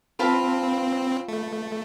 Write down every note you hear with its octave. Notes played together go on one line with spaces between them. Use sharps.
C4 F4 B4 F5 A5
A3